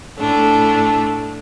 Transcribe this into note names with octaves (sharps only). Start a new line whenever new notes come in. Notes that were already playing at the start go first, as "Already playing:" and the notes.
A2 A3 D4